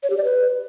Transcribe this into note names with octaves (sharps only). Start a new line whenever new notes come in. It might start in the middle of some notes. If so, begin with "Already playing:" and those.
C#5
G4
D5
B4